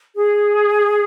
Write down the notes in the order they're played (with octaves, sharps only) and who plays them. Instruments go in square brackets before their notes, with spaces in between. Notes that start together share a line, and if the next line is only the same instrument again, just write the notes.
[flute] G#4